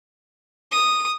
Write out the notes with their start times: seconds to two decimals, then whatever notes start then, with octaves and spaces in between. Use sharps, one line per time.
0.72 D#6